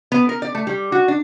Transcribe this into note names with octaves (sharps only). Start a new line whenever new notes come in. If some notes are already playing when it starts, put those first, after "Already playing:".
B3
A#4
D5
A3
G3
F#4
D4